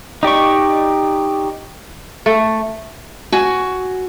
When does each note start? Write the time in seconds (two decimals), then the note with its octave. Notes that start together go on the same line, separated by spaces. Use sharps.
0.23 D#4 G4 D5 C#6
2.26 A3
3.32 F#4 G#5